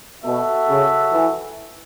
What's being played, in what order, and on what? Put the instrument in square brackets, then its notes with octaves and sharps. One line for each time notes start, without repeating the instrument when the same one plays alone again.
[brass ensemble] B2 [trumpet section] F#4 A4 E5
[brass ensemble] C#3
E3